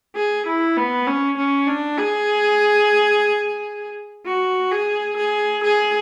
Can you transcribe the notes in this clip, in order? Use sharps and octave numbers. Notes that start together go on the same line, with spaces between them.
G#4
E4
B3
C#4
C#4
D4
G#4
F#4
G#4
G#4
G#4